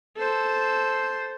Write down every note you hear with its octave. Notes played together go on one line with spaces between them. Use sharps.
A4 C5